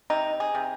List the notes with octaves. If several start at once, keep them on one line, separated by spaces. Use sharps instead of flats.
C3 D#4
G#4
C3